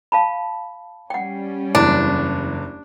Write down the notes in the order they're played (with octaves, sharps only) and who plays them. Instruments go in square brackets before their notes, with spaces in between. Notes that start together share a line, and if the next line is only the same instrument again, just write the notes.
[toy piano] F5 A5 B5
[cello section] G3 C#4 [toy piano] F#5 G5
[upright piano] F#1 E2 [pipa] D4